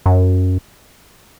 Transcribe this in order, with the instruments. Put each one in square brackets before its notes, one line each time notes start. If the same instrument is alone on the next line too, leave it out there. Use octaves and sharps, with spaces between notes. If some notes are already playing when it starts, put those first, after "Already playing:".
[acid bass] F#2